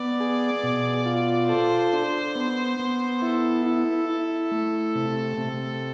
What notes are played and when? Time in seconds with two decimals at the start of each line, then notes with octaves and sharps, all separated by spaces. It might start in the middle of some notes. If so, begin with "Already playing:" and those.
Already playing: B3 D5
0.20 G#4
0.63 B2
1.06 F4
1.49 A4 C5
1.93 D4
2.35 B3
2.79 B3
3.22 E4 A4
3.66 E4
4.09 E4
4.52 A3
4.95 C3
5.37 C3